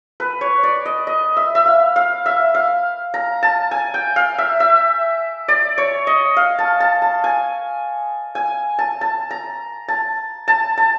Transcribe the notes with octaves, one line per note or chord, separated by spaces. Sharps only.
B4
C#5
D5
D#5
D#5
E5
E5
F5
F5
E5
F5
A#5
A5
G#5
G5
F5
E5
E5
D5
C#5
D#5
F5
A5
A5
A5
G#5
G#5
A5
A5
A#5
A5
A5
A5